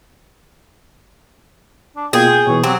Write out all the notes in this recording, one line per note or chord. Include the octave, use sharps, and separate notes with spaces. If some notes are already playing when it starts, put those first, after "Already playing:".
D4
B2 A#3 F4 G#4 G5
G6
B2 E3 C#5
F#3 C4 G4